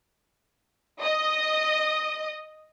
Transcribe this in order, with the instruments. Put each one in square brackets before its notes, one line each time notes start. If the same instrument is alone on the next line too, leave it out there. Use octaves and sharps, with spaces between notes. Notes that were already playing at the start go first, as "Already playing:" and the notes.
[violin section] D#5 D#6